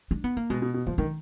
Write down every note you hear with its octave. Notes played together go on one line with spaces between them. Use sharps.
D4
B3
A#3
B2 G#3
B2
B2
F3 A#3
D#3 D4